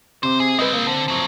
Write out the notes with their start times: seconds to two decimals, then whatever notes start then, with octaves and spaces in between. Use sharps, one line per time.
0.23 C3 C4 C5 D6
0.40 G#4
0.59 G#3 C4 B4 D#5
0.73 A#3
0.87 D3 C4
1.08 F3 F#3